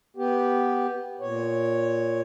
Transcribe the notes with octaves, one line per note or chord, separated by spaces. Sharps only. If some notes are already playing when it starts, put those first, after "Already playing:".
B3 G4
A#2 C#5